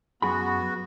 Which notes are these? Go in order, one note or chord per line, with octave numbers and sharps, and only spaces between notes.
F#2 B3 F#4 G#4 B5